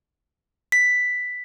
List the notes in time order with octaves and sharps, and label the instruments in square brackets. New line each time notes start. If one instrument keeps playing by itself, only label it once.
[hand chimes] B6